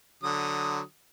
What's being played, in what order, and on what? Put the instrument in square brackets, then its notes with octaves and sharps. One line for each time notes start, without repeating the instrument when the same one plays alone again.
[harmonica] D3 F#3 D#6